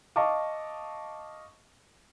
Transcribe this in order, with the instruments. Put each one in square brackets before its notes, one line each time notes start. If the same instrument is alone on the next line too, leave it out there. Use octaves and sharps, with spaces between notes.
[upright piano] D#5 F5 A5 C#6 D6